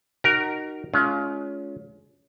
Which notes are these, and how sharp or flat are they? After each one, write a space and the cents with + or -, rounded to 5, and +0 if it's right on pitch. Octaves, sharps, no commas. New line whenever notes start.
D#4 -15 F#4 +30 A#4 +0
G#3 +35 C#4 +30 F4 +0